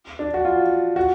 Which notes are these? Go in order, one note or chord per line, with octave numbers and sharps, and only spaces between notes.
D4
F#4
F4
F#4